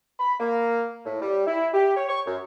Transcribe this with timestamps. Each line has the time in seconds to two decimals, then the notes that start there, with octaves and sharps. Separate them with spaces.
0.19 B5
0.40 A#3
1.05 A2
1.21 G3
1.46 E4
1.74 G4
1.96 C#5
2.08 C#6
2.26 F#2